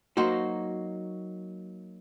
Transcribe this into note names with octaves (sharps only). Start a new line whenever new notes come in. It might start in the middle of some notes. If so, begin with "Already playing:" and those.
F#3 A#3 D#4 F#4 C5